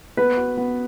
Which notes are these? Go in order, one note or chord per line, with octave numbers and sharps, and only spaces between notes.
B3 B4
F#4
B3